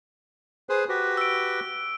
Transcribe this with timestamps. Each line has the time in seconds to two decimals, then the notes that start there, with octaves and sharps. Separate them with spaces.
0.69 G#4 B4 C5
0.89 F#4 G4 B4
1.17 E6 D7